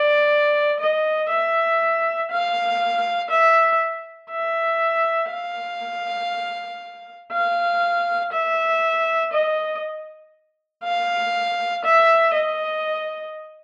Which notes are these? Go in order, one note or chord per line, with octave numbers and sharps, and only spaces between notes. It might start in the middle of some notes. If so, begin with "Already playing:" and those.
Already playing: D5
D#5
E5
F5
E5
E5
F5
F5
E5
D#5
F5
E5
D#5